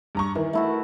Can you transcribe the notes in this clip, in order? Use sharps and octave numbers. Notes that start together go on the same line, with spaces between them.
G2 A#5 C#6
D#3 E3
A3 E4 F#4